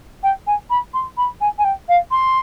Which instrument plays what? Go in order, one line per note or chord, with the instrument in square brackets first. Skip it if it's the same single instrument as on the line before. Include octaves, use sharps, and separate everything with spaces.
[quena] G5
G#5
B5
C6
B5
G#5
G#5
G5
F5
C6